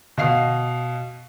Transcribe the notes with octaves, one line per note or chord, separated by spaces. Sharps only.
B2 D#5 F5 C7